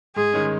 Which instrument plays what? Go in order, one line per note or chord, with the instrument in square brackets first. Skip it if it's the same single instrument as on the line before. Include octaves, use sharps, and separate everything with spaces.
[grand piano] G#2 [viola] G#4
[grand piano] D#3 G#3 C#4